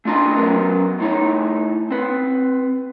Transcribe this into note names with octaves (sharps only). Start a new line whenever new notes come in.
A3 D4 F4 D#5 A#5
F#3 B3 C#4 A#4
A2 D#4 C#5
C4 B4